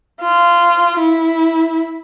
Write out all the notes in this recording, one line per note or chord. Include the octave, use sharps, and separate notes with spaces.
F4
E4